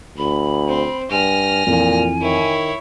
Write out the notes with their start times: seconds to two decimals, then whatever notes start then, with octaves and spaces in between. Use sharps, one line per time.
0.18 D2 B5
0.68 C4
1.11 G2 G#5 F6 A#6
1.67 F2 A#2 E3
2.21 D#3 E4 C#5